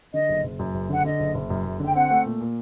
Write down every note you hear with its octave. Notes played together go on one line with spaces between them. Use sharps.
D3 D#5
F#1
F#1
F#2
F#1
D3 F#5
D3 D#5
F#1
F#1
F#2
F#1
D3 G5
C4 F#5
A3
A#2
A#2